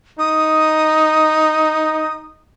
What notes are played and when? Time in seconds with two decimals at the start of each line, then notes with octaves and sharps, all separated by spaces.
0.19 D#4 D#6